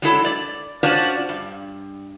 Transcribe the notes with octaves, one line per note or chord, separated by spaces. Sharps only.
F#3 G#3 D4 E4 A4
D5
C#4 D4 F4 F#4 C5 D5
G2